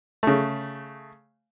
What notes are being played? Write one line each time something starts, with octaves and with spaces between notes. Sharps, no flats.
C#3 A3